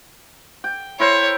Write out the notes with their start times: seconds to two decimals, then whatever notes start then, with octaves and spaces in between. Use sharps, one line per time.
0.64 G5
1.00 E4 A#4 C5 C#5